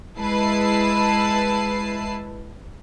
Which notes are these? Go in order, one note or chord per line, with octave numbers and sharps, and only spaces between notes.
G#3 E4 B4 A5 C7